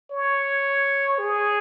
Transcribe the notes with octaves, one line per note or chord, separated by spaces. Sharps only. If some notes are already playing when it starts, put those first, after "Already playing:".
C#5
G#4